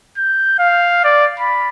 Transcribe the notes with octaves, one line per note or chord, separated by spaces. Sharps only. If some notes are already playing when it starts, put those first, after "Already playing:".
G6
F5
D5
B5